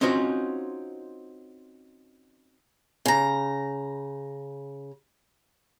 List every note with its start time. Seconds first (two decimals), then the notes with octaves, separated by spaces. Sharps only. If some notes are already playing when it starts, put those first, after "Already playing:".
0.01 C4 C#4 D#4 F4 F#4 C5
3.06 C#3 A#5